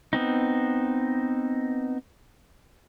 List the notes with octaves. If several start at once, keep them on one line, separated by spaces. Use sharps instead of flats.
B3 C4 D#4